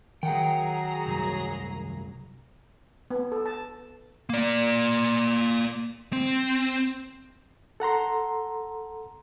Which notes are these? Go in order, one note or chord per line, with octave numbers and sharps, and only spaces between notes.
D#3 F#3 G#4 F#5 G5 A#5
C2 F#2
B3
A4
A5
A#3 D5
C4
A4 F#5 A#5 C6